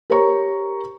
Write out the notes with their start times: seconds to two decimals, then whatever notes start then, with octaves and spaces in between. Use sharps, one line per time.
0.10 G4 A#4 C5 C#5 A#5 C#6